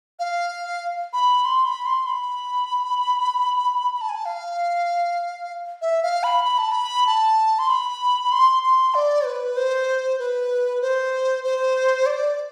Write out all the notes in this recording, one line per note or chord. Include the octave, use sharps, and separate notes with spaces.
F5
B5
C6
B5
C6
B5
B5
A5
G#5
A5
F5
E5
F5
B5
B5
A5
B5
A5
C6
B5
C6
C6
D5
B4
C5
B4
C5
C5
D5